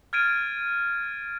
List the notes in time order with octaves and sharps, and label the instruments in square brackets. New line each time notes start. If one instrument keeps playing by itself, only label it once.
[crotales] F6 G#6 A6 D7 D#7